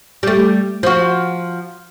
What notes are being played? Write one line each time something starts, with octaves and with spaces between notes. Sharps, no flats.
G3 A3
F3 F#4